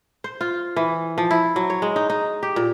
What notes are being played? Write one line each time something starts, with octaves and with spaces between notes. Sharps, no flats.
C5
F4
E3
F3
E4
F#3
C#5
G#3
D#4
D#4
G4
A#2